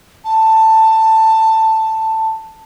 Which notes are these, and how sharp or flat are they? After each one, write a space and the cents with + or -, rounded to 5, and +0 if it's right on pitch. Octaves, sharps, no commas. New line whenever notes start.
A5 +10